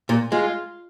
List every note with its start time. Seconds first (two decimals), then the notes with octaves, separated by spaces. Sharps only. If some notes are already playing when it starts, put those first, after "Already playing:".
0.09 A#2
0.32 G#3 F4